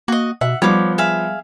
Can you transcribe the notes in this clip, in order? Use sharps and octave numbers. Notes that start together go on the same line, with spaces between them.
A#3 F#4 D#5
B2 E5 F#5
F3 G3 B3 C#5 D6
G#4 E5 F5